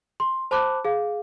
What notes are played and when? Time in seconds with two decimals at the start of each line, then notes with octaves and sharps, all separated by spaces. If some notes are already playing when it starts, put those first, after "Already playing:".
0.20 C6
0.51 C5 A5 B5 D6 F#6
0.85 G#4 F5